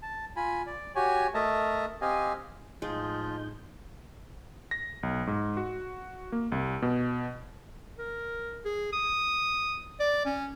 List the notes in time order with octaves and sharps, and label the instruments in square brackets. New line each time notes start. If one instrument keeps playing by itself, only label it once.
[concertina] A5
F4 G#5 B5
D5
F#4 G4 C#5 G#5
A3 A#4 D#5 E5 A5 A#5
C4 G4 D#5 F5 G#5
[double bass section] A1 [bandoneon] F3 F4 [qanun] G#3 [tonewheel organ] D#4 G6
[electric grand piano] A#6
B1
G#2
F#4
A#3
C2
B2
[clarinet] A#4
G#4
D#6
D5
C#4